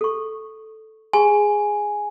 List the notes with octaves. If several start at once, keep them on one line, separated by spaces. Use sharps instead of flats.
A4 C#6
G#4 G#5 C6